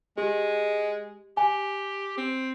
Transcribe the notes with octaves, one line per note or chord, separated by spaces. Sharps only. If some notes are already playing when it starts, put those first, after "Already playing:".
G#3 G4
G4 G#5
C4